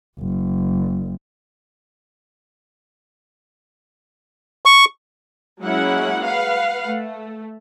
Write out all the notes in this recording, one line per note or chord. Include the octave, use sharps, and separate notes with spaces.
F#1
C#6
F#3 G#3 A#3 C#4 E4 F#5
B4 F5 F#5
A3